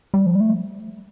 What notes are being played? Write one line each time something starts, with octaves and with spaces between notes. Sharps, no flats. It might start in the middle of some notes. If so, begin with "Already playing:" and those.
G3
F3
G3
A3